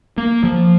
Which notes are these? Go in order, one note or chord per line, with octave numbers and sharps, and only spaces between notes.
A#3
F3